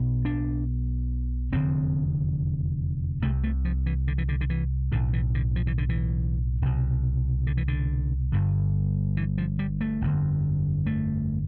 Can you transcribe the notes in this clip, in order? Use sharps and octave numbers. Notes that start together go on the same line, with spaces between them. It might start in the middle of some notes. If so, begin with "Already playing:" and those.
Already playing: B1 B2
D4
F1 E2 D3 C4
C2 C3 A3
A3
F3
E3
D3
E3
D3
D3
E3
B1 A2 D3
E3
D3
F3
E3
D3
E3
C2 B2
D3
E3
D3
G1 G2 D3
E3
F3
G3
A3
G1 F2 D3
A3